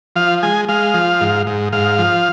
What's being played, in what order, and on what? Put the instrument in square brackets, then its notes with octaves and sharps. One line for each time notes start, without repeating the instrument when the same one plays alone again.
[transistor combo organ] F3 F5
G#3 G#5
G#3 F5
F3
G#2
G#2
G#2 F5
F3